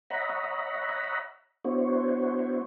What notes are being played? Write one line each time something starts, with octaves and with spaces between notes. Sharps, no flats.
C#5 D#5 E5 F#5 A#5 B5
B3 D4 E4 F#4 C5 C#5